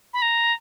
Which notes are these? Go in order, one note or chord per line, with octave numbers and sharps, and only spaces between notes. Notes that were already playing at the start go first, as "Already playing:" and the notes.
B5
A#5